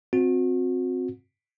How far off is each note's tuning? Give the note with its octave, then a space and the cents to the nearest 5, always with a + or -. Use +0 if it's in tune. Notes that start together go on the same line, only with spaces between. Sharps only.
C4 +0 F#4 -35